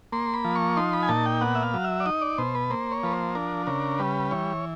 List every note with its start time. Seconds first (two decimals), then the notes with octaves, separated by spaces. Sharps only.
0.12 A#3 C6
0.34 B5
0.45 F3
0.55 C#6
0.77 D#4 C6
0.93 B5
1.02 G#5
1.09 A#2 A5
1.26 G5
1.41 B3 F#5
1.55 E5
1.63 F5
1.74 F#3
1.84 E5
2.00 D5
2.06 D#4 D#5
2.21 D5
2.38 B2 C5
2.55 B4
2.70 A#3 C5
2.92 C#5
3.03 F3 B4
3.13 C5
3.35 D4 A#4
3.67 C#3 A#4
3.99 G3 B4
4.31 E3 C#5